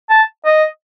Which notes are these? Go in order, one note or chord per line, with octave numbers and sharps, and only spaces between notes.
A5
D#5